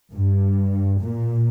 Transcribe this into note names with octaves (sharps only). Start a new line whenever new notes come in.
G2
A#2